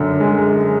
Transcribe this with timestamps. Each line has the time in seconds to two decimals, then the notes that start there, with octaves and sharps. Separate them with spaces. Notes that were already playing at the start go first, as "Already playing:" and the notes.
Already playing: F#2 D3
0.20 G#3